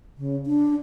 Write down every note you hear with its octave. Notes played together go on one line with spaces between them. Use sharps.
C#3
D4